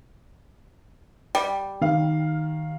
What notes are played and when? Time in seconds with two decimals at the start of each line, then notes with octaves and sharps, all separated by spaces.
1.35 G3
1.81 D#3 F5